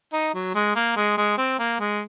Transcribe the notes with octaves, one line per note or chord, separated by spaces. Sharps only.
D#4
F#3
G#3
A#3
G#3
G#3
C4
A#3
G#3